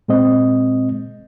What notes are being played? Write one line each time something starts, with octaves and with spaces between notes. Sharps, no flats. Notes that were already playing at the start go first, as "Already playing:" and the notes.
A#2 G#3 C4 D#5